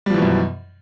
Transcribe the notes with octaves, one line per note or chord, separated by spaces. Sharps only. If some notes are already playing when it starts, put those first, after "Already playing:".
F#2 B2 E3 F3 G3